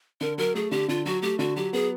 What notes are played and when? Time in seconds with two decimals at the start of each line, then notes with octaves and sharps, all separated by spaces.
0.21 D3 A#4
0.38 F#3 A#4
0.55 A3 G#4
0.71 D3 G4
0.89 D3 F4
1.05 F#3 F#4
1.22 A3 G4
1.39 D3 F#4
1.56 F#3 G4
1.73 B3 G#4